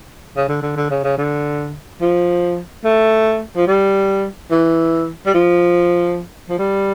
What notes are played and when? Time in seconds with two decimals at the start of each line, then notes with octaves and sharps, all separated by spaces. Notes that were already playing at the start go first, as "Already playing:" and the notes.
0.37 C#3
0.49 D3
0.62 D3
0.76 D3
0.90 C#3
1.04 C#3
1.18 D3
2.02 F3
2.85 A3
3.56 F3
3.68 G3
4.51 E3
5.26 G3
5.34 F3
6.50 F3
6.59 G3